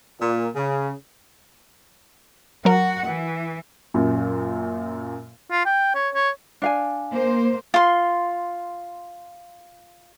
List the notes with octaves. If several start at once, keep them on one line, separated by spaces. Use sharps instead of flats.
A#2
C#3
F#3 F#4 A#4 F#5
E3
F#2 A#2
F4
G5
C#5
C#5
D4 F5 G#5
A#3 C5
F4 C6